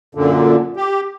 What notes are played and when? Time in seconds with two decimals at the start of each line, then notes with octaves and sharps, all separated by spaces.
0.15 F#2 A#2 D3
0.76 G4